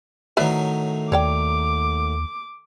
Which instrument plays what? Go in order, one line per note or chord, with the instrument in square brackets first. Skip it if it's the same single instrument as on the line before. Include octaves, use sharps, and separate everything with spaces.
[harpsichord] A2 D#3 F#3 [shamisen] B4 D5 E5
[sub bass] D#2 [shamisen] C#5 D5 G5 [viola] D6